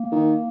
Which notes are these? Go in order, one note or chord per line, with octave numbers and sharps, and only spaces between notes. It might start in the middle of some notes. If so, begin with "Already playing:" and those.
Already playing: A#3
D#3